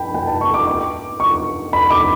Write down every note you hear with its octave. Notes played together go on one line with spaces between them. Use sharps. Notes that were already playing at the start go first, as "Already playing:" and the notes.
Already playing: G5 A5 B5
G5
A5
C#6
D6
D6
C#6
B5
D6